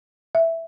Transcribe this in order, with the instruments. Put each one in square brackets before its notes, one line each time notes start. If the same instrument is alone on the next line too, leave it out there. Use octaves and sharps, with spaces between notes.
[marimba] E5